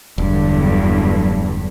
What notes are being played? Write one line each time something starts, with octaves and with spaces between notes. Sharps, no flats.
E1 E2 G2 D3 F#3